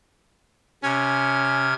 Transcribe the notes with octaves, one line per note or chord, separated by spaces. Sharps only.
C3 C#4 F6 G#6